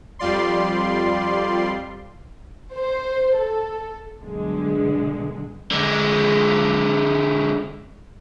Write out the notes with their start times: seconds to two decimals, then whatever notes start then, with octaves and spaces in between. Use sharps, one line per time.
0.19 F2 G3 F4 D5 C6
2.74 C5
3.36 A4
4.22 B1 G2 D3 G#3
5.71 D3 G#3